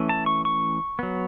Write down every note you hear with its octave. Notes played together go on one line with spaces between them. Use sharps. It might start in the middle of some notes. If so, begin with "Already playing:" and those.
Already playing: E3 A3 C#4
A5
C#6
C#6
F#3 B3